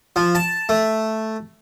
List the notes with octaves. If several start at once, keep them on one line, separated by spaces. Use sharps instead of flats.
F3
A5
A3